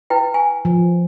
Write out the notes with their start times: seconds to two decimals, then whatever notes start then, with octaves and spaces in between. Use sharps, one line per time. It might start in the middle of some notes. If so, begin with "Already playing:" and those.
0.10 E4 B4 G5
0.34 G#5
0.65 F3